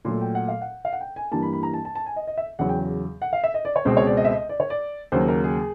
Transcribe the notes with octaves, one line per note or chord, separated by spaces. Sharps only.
A#2 F#3 A3 C6
G5
F#5
F5
F#5
F5
F#5
G5
G#5
G2 E3 G3 A#3 A5
B5
B5
A#5
A5
A5
A5
G#5
D#5
D#5
E5
E2 C#3 F#3 F#5
G5
F#5
F5
E5
D#5
D5
C#5
C#2 B2 G#3 C4 C5
C#5
D5
D#5
E5
D#5
D5
C#5
D5
D#2 C#3 F#3 A#3 C5
A#4
G#4